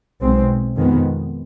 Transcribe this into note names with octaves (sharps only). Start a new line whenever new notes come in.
B1 B2 G#3 C4
F2 D#3 G#3 B3